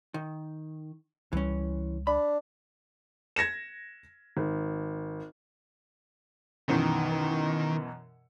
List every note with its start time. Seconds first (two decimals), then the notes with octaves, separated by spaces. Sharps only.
0.14 D#3
1.33 C#2 E3 G3 C#4
2.07 D4 B5
3.36 G#6 A#6 C#7 E7
4.37 G#1
6.69 F#2 B2 D#3 E3